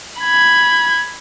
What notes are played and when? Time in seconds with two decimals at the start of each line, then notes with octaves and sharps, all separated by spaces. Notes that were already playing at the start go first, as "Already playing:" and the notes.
0.20 B5 G#6